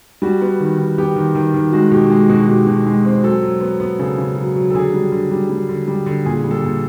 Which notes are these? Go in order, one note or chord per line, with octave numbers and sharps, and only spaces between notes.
G3 F#4
B3
D#3
D#3
B3 G4
D#3
D#3
D#3
G#3 F#4
B2 G4
G#3
B2 F#4
B2 G4
B2
G#3
C4
F#3 A4
F#3
B3
B3
C#3 A4
C#3
F#3
F#3
A4
D3 G#4
G3
D3
G3
G3
D3
G3
D3
A#2 G#4
G3
A4
A#2